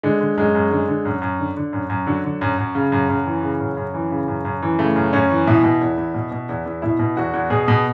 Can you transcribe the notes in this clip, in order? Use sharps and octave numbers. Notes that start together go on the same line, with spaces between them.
D3 G#3
D3
F#2 G#3
F#2
D3 G#3
D3
F#2
F#2
D3
D3
F#2
F#2
D3 F#3
D3
F#2
F#2
C#3
F#2
F#2
E3
C#3
F#2
F#2
E3
C#3
F#2
F#2
E3
C#3 A3
F#2
F#2 C#4
E3
B2 E4
B2
E2
E2
B2
B2
E2
E2
B2 E4
B2
E2 F#4
E2
B2 G#4
B2